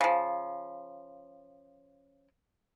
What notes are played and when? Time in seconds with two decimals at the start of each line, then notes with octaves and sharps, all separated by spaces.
0.01 C#3 F3